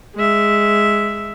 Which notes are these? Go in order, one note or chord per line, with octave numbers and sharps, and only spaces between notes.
G#3 E5